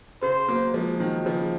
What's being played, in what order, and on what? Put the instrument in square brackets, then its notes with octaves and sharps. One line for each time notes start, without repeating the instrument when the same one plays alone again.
[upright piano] C#3 [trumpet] C5
[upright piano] F#3 A#3
F3 G#3
D#3 F#3
C#3 F3